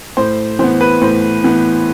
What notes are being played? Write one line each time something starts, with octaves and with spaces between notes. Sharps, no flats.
A2 C5
E3 B3 C5
B4
A2 C5
E3 B3